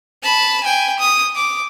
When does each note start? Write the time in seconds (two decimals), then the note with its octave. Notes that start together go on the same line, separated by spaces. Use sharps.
0.23 A5 B5
0.64 G5 G#5
0.99 D#6
1.36 D6